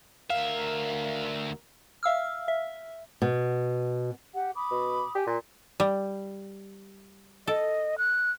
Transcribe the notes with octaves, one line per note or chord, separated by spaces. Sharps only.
D2 A#4 E5 F5
E5 F5 E6 F6
E5
B2
G4 F#5
B5 D6 D#6
B2
G4 G#5
A#2
G3
A4 D#5
F#6